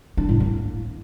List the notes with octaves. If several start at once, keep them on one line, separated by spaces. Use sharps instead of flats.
D4
A2
A#3